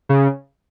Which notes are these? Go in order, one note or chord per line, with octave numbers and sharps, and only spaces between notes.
C#3